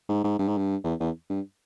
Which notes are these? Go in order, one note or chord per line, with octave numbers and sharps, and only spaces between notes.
G#2
G#2
G2
G#2
G2
E2
E2
G2